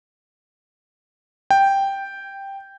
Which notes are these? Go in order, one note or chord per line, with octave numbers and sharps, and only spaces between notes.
G5